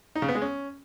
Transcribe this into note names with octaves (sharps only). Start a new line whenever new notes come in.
D#4
C#3
B3
G#3
C#4